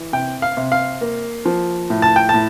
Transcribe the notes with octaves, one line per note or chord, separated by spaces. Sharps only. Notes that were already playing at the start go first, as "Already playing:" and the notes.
Already playing: E3
C3 G5
F5
C3
F5
A#3
F3
A2
A5
G5
A2 A5